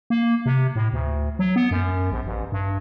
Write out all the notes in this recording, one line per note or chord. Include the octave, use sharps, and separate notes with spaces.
A#3
C3
A2
D2
F#3
B3
F#2
A#1
A1
G2